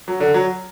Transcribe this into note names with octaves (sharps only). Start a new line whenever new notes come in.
F#3
D3
F#3